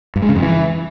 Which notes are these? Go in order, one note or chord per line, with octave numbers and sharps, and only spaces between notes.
G2
G#3
C#3
F2
E3